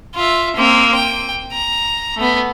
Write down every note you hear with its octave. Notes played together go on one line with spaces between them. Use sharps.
F4 E5
A#3 C4
G5
A#5
A3 B3